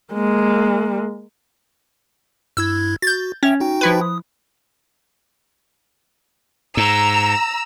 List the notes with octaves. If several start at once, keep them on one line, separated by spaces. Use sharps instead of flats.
G#3 A#3
G2 E4 E6 G#6
F#4 G6 A6
C#4 E5 G5
D#4 F#4 G5
F3 E4 B4
D#6
G#2 A#5 E6